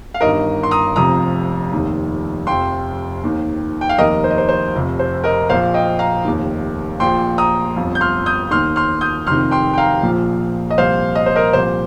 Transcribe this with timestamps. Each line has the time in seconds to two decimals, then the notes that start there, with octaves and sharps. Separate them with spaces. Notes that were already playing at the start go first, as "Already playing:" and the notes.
0.14 F5
0.21 G1 G2 D#3 A#4 D#5
0.63 C6
0.71 A#5 D#6
0.96 F1 F2 C3 F3 A#5 D#6
1.72 F1 D#2 D#3
2.47 F1 F2 F3 G5 C6
3.23 D#2 D#3
3.81 G5
3.89 F5
3.98 F1 D#2 D#3 A#4 D#5
4.24 C5
4.30 D#5
4.38 C5
4.49 C5
4.74 F1 F2 C3
4.99 C5
5.24 A#4 D#5
5.49 A#1 A#2 F3 C5 F5
5.74 D#5 G5
5.99 F5 A#5
6.25 F1 D#2 D#3
7.00 A#1 A#2 F3 G5 C6
7.38 A#5 D#6
7.76 G1 F2 F3
7.95 G6
8.01 C6 F6
8.26 D#6 G6
8.51 D#2 D#3 C6 F6
8.76 C6 F6
9.01 D#6 G6
9.27 F1 F2 C3 D#3 C6 F6
9.51 G5 C6
9.73 G5
9.78 F5 A#5
10.03 A#1 A#2 F3
10.70 D#5
10.78 C2 A#2 F3 C5 F5
11.15 D#5
11.26 C5
11.36 A#4 D#5
11.53 C2 A#2 F3 C5